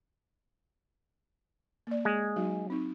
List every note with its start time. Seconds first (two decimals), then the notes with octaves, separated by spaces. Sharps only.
1.87 A#3 D5
2.05 G#3
2.36 F#3 D#4 F#4
2.70 C4 D#4